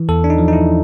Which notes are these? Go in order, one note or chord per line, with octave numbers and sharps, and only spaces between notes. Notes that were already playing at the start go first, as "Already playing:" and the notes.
Already playing: E3
E2 A4
D4
D#4
F3
D#4
E4